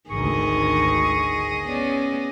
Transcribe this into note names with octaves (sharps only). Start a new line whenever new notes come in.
G#1 D2 D#3 G#4 D#5 C#6
B3 C#4 D5